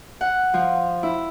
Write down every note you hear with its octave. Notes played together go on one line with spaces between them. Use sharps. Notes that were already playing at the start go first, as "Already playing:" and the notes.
F#5
F3
E4